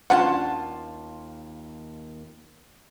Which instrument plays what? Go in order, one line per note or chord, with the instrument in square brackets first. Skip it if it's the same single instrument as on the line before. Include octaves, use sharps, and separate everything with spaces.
[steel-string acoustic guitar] D#2 F4 A5 [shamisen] C#4 D4 F#5